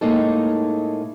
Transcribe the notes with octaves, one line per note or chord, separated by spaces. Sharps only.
A2 G#3 A#3 D#4 A4